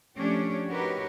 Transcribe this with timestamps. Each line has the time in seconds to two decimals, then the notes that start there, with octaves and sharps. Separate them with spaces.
0.16 F3 A3 C#4 D4 G4 C#5
0.69 D#4 F#4 G4 A#4 B4 C#5